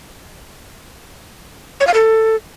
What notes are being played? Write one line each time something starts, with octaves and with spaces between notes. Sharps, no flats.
C#5
F5
A4